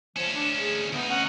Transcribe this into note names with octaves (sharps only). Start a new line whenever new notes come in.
D2 F3 C#4 E7
D4
G#4
D2 B3 D#4
C#4 F#5